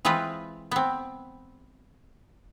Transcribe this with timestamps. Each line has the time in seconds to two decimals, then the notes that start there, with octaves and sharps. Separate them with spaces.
0.05 E3 G#3 C4 F4 B4
0.71 B3 C4